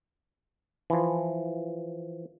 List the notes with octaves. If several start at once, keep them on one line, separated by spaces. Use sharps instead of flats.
E3 F3